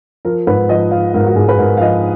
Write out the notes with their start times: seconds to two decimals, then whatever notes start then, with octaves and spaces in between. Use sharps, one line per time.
0.25 F3 A#4
0.47 G#2 B4
0.69 F3 D#5
0.91 F3 F5
1.14 G#2 A#4
1.26 F#4
1.36 G#2 G#4
1.49 B4
1.58 G#2 A#4
1.77 F5
1.81 F3 D#5